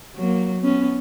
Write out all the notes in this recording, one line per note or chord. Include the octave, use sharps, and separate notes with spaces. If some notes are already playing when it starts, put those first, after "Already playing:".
F#3 A#3
B3 C#4